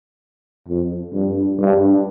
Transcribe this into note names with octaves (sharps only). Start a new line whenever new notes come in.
F2
G2
G2